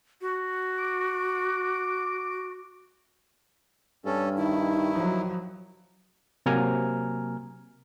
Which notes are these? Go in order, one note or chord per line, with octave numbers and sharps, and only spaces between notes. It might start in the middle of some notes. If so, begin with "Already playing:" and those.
F#4
D6
G2 C#4 A4
D#3 D#4 E4
F3 F#3
C3 F#3 A#3 G#5 A#5 F6